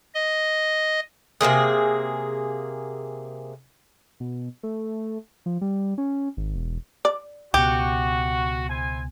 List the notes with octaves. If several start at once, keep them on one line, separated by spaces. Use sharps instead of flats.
D#5
C3 D#3 A#3 G#4
B2
A3
F3
G3
C#4
G#1
E1
D5
C#2 B2 F#4 G4
E4 C5 G#5